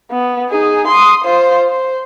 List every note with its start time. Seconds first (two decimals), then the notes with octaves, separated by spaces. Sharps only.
0.11 B3
0.49 D#4 G#4
0.88 C6 D#6
1.25 F4 C5
1.69 C5